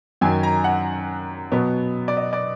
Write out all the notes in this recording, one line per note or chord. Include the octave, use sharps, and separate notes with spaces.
F#2 D#3 F#3 G#5
A#5
F#5
B2 F#3 B3
D5
D#5
D5